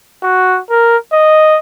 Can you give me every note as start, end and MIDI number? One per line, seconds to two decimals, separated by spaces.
0.23 0.59 66
0.70 0.97 70
1.13 1.59 75